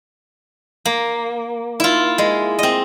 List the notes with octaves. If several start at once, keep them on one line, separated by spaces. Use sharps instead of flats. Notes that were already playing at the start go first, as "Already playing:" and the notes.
A#3
E4 F4
G#3
C4 D#5